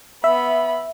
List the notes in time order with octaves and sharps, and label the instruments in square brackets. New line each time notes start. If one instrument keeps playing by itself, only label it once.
[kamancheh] B3 B5 [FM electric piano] E5